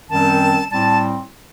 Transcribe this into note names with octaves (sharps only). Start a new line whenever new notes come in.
F#2 D#3 G3 C4 A5
A2 G3 C4 A5